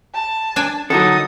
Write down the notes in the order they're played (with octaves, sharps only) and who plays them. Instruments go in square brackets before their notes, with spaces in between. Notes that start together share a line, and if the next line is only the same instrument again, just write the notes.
[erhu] A5
[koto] D4 G#5
[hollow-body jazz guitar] D3 F#4 A#4 [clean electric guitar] F#3 D#4 A4 [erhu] D#6